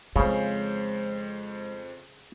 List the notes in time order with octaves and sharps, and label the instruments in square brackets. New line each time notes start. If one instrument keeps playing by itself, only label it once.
[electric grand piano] F2 C5 [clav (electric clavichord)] C#3 [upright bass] G#3